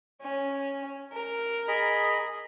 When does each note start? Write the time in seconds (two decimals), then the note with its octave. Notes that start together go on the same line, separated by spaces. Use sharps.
0.22 C#4
1.13 A#4
1.68 G#4 D#5 B5